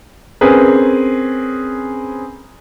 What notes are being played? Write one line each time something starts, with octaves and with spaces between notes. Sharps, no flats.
C4 C#4 G#4 A#4 B4